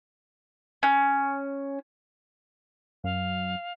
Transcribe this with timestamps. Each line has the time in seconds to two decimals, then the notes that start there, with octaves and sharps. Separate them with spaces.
0.83 C#4
3.04 F#2 F5